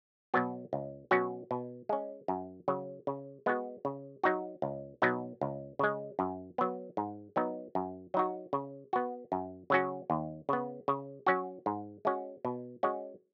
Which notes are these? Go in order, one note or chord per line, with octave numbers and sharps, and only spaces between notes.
B2 F#3 B3 F#4
C#2
B2 F#3 C#4 F#4
B2
G#3 C#4
F#2
C#3 F#3
C#3
G#3 B3 F#4
C#3
F#3 D#4 F#4
C#2
B2 F#3 B3 D#4
C#2
C#3 G#3
F#2
F#3 B3
G#2
F#3 B3 D#4
F#2
F#3 D#4 F#4
C#3
B3 F#4
F#2
C#3 F#3 C#4 F#4
D#2
C#3 B3
C#3
F#3 C#4 F#4
G#2
G#3 C#4 F#4
B2
G#3 C#4 F#4